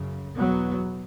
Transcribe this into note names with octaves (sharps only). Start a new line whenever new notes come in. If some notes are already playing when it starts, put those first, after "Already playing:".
Already playing: F#2 C#3
E2 B2 F#3 B3